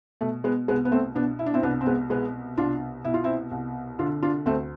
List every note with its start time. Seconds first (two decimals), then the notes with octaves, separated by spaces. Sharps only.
0.21 B2 A3
0.44 G#3 B3
0.68 C2 G#3 B3
0.85 B3
0.91 A3 C4
1.15 B2 B3 D4
1.39 E4
1.46 D4
1.54 C4 E4
1.62 C2 B3 D4
1.81 C4
1.86 G#3 B3
2.10 B2 G#3 B3
2.57 C2 D4 F4
3.04 B2 E4
3.14 F4
3.24 C4 E4
3.51 C2
3.99 D3 D4 F4
4.23 D4 F4
4.46 D2 A3 C4